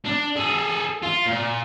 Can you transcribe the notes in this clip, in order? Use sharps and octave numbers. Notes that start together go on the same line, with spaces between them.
D4
G#4 A4
F4
A#2